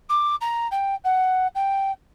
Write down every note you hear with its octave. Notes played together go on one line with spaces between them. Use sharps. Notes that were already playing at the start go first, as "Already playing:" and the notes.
D6
A#5
G5
F#5
G5